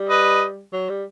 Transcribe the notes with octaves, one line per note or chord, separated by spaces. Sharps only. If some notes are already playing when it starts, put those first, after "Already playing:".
Already playing: G3
B4 D#5
F#3
G3